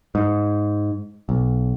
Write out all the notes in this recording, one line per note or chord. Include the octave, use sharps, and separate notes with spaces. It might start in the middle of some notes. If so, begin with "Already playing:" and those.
G#2
B1